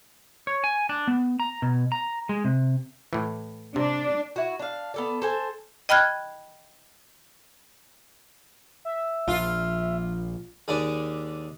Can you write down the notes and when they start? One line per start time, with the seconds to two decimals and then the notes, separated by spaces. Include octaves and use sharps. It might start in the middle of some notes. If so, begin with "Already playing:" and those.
0.47 C#5
0.64 G#5
0.89 D4
1.08 B3
1.40 A#5
1.62 B2
1.92 A#5
2.29 G#3
2.44 C3
3.13 A2 E3
3.76 C3 D4
4.36 E4 F#4
4.59 D4 F5
4.94 B3 A4 D5
5.22 A4 C5 G#5
5.89 D#5 G5 B5 F6 F#6 G#6
8.85 E5
9.28 A#1 F3 F4
10.68 D#2 G#3 D4 G#4 D6